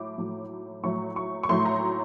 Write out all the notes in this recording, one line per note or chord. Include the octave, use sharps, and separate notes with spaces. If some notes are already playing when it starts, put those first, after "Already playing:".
Already playing: A2 F#3 A3 D6
A2 F#3 A3
A2 F#3 A3 C#6
C#6
C#6
A2 F#3 A3 C6
A#5